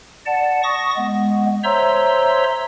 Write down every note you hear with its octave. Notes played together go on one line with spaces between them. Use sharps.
D5 F#5 A5
C#6 D#6 A#6
G#3 B3
C5 C#5 E5 A#5 C6 E6